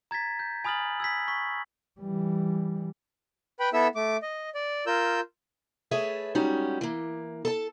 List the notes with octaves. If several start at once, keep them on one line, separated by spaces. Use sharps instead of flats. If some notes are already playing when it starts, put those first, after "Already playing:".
A#5 G#6 A6 B6
G6
G#5 B5 D#6 F6 A6 F#7
E6 G#6 B6
C#6 B6
E3 G3
B4 G5 B5
B3 E4 A4 E5 E6
A3 D6
D#5
D5
F4 A#4 E6 G6
A3 G#4 A4 B4 C#5 E5
G3 G#3 C#4 D#4 F#4
E3 A#3
A4 A5